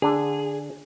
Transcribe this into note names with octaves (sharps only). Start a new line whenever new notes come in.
D3 D4 G#4